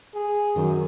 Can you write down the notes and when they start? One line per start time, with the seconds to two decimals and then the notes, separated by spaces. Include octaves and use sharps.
0.14 G#4
0.56 F#2 D#3